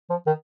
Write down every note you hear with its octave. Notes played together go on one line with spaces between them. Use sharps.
F3
D#3